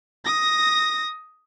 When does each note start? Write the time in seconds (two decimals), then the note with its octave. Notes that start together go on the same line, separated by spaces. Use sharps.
0.25 D#6 A#6